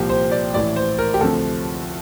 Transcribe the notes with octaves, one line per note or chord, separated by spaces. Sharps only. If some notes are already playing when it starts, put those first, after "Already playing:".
Already playing: C2 A#2 F3 G4
C5
D5
A1 A2 E3 D5
C5
A#4
G4
D2 C3 F3 A4